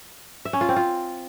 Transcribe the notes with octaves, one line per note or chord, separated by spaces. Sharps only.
E5
C#4
F4
C4
F4